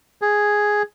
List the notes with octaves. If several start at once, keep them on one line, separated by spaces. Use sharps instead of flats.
G#4